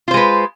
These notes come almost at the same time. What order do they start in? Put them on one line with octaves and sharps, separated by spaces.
F4 C5 G#3 B4